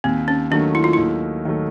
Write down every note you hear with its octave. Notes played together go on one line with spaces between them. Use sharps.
D#2 C4
C#4
D#3 F#3 A3 D4
E4
F4
D#2 E4
D#3 F#3 A3